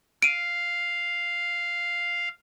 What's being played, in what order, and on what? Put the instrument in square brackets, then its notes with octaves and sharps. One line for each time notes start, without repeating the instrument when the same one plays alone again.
[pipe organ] F5 [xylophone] D7 D#7